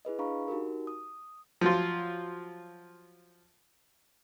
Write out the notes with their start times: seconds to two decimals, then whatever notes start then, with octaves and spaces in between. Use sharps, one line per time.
0.05 E4 G#4 B4 D#5
0.19 D4 G#4 F5 A#5 B5 C#6
0.48 D#4 F#4 G4 A#4
0.87 D#6
1.61 F3 F#3 F4